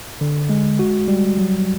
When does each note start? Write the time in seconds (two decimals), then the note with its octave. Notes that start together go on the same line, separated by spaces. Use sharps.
0.21 D3
0.49 G#3
0.79 F#4
1.08 G3
1.38 F#3